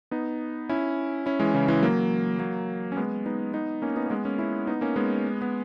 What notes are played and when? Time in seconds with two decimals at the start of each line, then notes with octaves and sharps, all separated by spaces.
0.11 B3 D#4
0.69 C#4 E4
1.26 C#4 E4
1.40 E3 G#3
1.54 C#3 E3
1.68 E3 G#3
1.83 F#3 A#3
2.39 F#3 A#3
2.92 C#4
2.97 G#3 B3
3.26 B3 D#4
3.54 B3 D#4
3.82 A#3 C#4
3.96 B3 D#4
4.06 A#3
4.10 G#3 B3
4.25 A#3 C#4
4.38 C#4 E4
4.67 B3 D#4
4.81 A#3 C#4
4.96 G#3 B3
5.42 B3